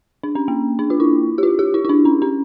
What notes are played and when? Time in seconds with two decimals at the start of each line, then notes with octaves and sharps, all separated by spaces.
0.23 D4
0.35 C#4
0.48 A#3
0.79 D4
0.90 F4
1.00 E4
1.38 G4
1.43 F4
1.59 G4
1.74 E4
1.85 E4
1.89 D4
2.05 C#4
2.22 C#4